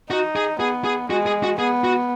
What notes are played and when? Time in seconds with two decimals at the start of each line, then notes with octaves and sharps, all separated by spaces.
0.10 D#4 F#4
0.36 G#4
0.60 B3 G#4
0.84 G#4
1.10 G#3 F#4
1.26 G#4
1.43 F#4
1.59 B3 G#4
1.84 F#4